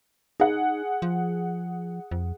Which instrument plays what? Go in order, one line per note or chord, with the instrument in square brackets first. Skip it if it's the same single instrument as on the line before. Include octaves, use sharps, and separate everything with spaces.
[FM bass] D#4 [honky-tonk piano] G#4 F#5
[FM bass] F3
F2